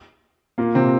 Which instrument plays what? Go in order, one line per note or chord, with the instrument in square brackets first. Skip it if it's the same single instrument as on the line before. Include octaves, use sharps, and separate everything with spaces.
[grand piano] A#2 A#3
C3 C4